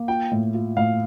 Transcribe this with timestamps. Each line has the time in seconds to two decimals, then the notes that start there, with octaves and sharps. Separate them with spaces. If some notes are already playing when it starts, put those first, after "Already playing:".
Already playing: A#3
0.08 F4 G5
0.31 A2
0.54 F4
0.77 A2 F5